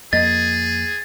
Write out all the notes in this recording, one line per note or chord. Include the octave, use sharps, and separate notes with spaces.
F2 A#3 G#4 D#5 A6